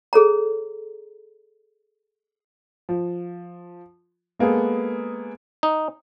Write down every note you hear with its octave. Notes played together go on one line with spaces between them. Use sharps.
G#4 A4 C#5 A#5
F3
G#3 A#3 B3 G#4 A4
D#4